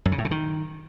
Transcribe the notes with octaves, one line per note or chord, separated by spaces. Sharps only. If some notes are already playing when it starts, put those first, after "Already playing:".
F#2
C#3
A2
C#3
D#3